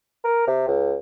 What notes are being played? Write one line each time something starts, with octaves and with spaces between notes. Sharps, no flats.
A#4
C3
C#2